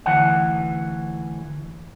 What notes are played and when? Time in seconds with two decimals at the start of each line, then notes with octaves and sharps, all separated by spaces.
0.06 D2 D#3 E3 F#5